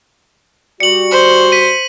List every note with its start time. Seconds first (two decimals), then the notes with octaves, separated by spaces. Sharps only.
0.80 G3 F#4 C#7 F#7
1.11 C5
1.52 B6 D#7